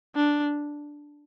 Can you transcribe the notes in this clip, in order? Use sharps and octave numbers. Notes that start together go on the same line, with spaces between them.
D4